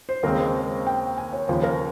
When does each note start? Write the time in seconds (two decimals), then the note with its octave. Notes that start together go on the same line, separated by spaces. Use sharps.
0.09 C5
0.23 D#2 C#3 G#3 C4 A#4
0.39 C5
0.87 G5
1.18 G#5
1.33 C#5
1.48 D#2 C#3 F3 C5
1.63 A#4